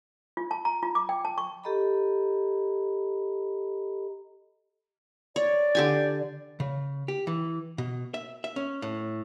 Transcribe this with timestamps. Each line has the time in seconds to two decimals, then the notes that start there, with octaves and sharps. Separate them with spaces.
0.37 F4
0.51 A5
0.65 A#5
0.83 F4
0.95 D6
1.09 G5
1.25 A5
1.38 C#6
1.64 G4 A4 D#5 A#5 B5
5.36 C#5 D5
5.75 D3 G4 G#5
6.60 C#3
7.08 G4
7.27 E3
7.78 B2
8.14 E5
8.44 E5
8.56 C#4
8.82 A2